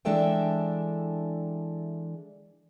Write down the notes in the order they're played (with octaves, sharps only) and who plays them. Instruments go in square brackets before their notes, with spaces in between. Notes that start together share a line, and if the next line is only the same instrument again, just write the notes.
[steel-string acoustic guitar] E3 G#3 D4 A4 E5 G5